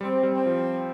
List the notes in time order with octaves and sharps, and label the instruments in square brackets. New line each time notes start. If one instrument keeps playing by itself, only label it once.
[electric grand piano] G3 [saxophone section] C4
[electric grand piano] G3
[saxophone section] C4
[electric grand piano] F3